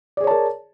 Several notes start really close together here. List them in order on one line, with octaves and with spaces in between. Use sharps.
D5 G#4 C#5 A5 A#4